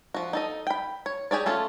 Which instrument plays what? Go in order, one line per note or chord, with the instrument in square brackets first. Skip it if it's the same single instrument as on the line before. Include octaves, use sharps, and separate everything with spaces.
[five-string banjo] F3 F#4
D#4 A4 D#5
G5 B5
C#5
G4 G#4 C#5 D5
A3 C#4 F4 A4